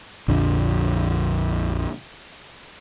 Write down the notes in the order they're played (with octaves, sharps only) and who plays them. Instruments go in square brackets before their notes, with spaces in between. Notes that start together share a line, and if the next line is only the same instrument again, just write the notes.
[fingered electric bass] A#1 F2 D3